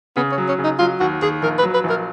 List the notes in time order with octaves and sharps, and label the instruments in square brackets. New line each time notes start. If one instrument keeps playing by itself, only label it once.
[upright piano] C#3 [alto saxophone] B3
[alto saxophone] C#4
[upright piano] F#3
[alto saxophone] C#4
[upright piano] C#3
[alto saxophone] D#4
[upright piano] F#3 [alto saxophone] F4
[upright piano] D#2 [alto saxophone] F#4
[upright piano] D#2 [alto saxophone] G#4
[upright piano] A#1 [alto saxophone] A#4
[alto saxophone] B4
[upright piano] F#3
[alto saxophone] B4
[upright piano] A#1
[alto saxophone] A#4